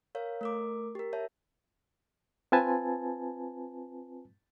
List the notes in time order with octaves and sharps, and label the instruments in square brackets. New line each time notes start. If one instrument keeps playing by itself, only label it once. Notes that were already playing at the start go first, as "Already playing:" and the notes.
[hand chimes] A#4 C#5 F5
A3 A#4 D6
G4 A#4
C#5 E5 A5
[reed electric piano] C4 F4 B4 G#5 A5